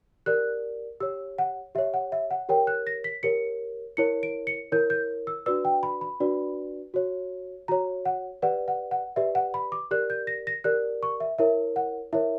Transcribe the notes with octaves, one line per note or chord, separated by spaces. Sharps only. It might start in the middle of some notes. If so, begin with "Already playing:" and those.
G4 A#4 D5 F#6
G4 C#5 E6
F#5
G4 C#5 E5
F#5
E5
F#5
G4 A#4 C#5 G5
F#6
A#6
B6
G4 A#4 C#5 C#7
E4 A#4 C#5 C#7
D7
C#7
E4 A#4 C#5 G6
G6
E6
D4 F#4 B4 D5 E6
G5
B5
B5
D4 F#4 B4 D5
F#4 C#5
F#4 C#5 A#5
F#5
G4 B4 D5 F#5
F#5
F#5
G4 B4 D5 E5
F#5
B5
D6
G4 A#4 D5 F#6
G6
A#6
A#6
G4 A#4 D5 F#6
C#6
E5
E4 A#4 C#5 E5
F#5
E4 A#4 C#5 E5